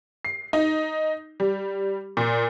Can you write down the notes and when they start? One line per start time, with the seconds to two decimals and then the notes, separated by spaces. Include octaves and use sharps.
0.25 C7
0.53 D#4
1.40 G3
2.17 A#2